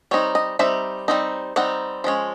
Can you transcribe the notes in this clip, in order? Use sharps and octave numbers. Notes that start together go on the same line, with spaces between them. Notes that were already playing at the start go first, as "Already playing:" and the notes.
G3 C4 D#4 C#5
D#5
G3 C4 D#4 E5
G3 C4 D#4
G3 C4 D#4 F#5
F3 G#3 C#4